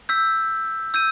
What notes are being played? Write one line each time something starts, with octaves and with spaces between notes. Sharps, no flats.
E6 G6 B6
E6 G6 D#7